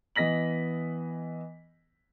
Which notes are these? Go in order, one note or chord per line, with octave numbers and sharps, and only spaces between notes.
E3 B3 D#5 A#6 B6 F#7